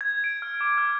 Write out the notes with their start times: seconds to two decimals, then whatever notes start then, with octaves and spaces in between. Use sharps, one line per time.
0.01 G#6
0.24 D7
0.42 F6
0.61 D6
0.78 F6